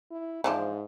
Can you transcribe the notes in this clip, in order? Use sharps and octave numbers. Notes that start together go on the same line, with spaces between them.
E4
G#2 E3 F3 D4